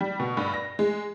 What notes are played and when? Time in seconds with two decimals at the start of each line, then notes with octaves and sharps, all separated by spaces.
0.01 G3
0.20 B2
0.37 G2
0.54 A#6
0.79 G#3